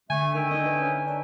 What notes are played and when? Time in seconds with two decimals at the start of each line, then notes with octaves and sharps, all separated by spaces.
0.10 D3 A3 G#5
0.35 D#3 E5 G5 G#5
0.51 D4 D#4 D#5
0.66 B4
0.80 C#4
1.07 D4